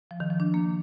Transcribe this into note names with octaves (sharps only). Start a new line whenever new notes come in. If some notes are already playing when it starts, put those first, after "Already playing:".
F3
D#3
F3
D4
A#3